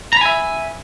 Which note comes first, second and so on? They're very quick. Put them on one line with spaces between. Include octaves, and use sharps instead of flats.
A#5 B5 G#5 E5